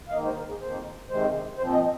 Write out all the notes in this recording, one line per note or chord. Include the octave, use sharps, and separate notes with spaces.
F5
G#2 D#3 A#3 D#5
C5
A#4
G#4
F2 D#3 A#3 C5
C3 D#3 G#3 C5
A#2 F3 C4 C5
D#5